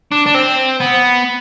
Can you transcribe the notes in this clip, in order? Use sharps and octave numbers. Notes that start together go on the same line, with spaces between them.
D4
D4
C4
B3